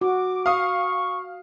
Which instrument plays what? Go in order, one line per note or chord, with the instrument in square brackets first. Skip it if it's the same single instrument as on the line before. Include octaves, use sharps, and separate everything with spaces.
[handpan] F#4 [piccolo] D6
[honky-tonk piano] F5 D#6 [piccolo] C#6